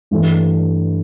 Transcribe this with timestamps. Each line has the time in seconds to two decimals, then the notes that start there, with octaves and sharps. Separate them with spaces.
0.11 G2 E3 A3